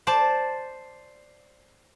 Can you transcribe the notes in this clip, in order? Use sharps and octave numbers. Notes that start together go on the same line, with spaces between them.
C5 D5 A5